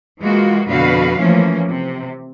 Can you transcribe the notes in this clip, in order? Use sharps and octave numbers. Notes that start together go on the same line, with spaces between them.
E3 G#3 A#3 F4 F#4
F2 B2 D3 F#4 B4 F5
E3 F3 A3 A#3 C#4
C3